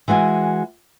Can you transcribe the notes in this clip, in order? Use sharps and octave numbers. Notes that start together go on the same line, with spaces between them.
E3 G#3 F#4 G5 G#5